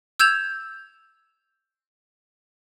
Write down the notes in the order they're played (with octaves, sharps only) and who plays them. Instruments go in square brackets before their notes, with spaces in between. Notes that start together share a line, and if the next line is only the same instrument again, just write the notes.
[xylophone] E6 G6 G#6 E7 F7